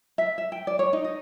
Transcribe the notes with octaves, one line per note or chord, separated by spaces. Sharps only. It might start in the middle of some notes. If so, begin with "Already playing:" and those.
E5
E5
G5
D5
C#5
D#4
D#5